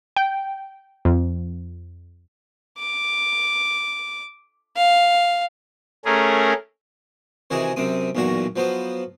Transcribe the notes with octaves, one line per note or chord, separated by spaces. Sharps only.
G5
F2
D6
F5
A3 C#4 G#4 A#4
C3 D#3 E3 F#4 G#4
F#2 C3 C4 D#6
B1 E2 A#2 F#4 A#5
F3 F#3 B3 C5